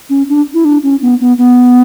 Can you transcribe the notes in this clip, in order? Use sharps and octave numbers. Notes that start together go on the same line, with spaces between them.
C#4
D4
E4
D4
C#4
B3
B3
B3